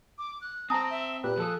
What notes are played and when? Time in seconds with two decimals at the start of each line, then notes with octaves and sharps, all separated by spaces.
0.18 D6
0.41 F#6
0.70 C4 C5 A5 A#5 D#6 A#6
0.90 E5
1.24 A#2 G4 B4 F#6
1.38 F3 G#4 A4 D#6